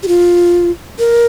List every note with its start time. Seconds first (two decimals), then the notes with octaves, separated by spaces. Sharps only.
0.03 G4
0.08 F4
0.99 A#4